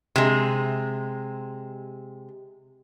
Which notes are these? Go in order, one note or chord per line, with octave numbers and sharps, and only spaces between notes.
C3 G#3